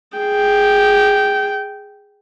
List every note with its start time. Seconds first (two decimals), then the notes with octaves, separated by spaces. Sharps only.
0.17 G#4 G5